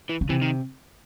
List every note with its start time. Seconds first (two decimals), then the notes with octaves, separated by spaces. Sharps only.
0.09 E3
0.21 C#3
0.29 C3 E3
0.42 D#3